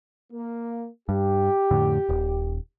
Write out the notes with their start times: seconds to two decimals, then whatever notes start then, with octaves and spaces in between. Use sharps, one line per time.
0.32 A#3
1.09 G2 G4
1.71 F2 A2 D3
2.09 D#1